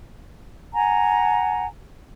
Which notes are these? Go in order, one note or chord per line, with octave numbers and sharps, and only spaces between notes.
F#5 G#5 A#5